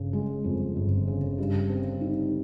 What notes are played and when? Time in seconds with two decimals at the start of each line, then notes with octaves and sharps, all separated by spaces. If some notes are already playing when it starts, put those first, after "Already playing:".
Already playing: G1 C#3
0.13 G#3
0.44 F2
0.76 G1
1.07 C#3
1.38 G2
1.69 C4
2.01 D#4